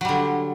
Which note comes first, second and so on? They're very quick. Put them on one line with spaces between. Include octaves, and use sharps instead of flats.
F#3 G3 D3